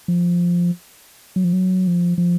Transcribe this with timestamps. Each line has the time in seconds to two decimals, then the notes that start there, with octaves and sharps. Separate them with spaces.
0.08 F3
1.36 F#3
1.44 F3
1.53 F#3
1.87 F3
2.18 F3